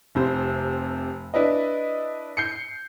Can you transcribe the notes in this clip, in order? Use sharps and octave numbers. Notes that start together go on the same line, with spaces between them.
F1 C3 C5
D4 E4 B4 D#5
G6 C7 C#7